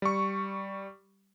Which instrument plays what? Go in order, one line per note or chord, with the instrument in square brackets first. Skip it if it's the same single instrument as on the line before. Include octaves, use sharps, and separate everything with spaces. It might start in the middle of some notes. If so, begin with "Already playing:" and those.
[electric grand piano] G3 C#6